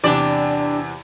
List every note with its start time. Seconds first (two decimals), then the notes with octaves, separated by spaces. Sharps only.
0.04 E2 C3 D4 G4 D5